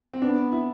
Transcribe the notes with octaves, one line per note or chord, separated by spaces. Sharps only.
C4
B3 D4
E4